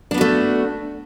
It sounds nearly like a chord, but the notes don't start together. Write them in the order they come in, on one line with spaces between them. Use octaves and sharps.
D4 B3 F#4 A3